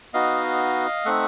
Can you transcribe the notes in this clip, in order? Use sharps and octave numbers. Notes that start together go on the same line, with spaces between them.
B3 D#4 F#4 D#5 F5
A3 C4 D#4 E5 F#5